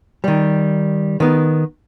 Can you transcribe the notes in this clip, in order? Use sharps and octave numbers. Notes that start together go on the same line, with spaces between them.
D#3 G3
D#3 B3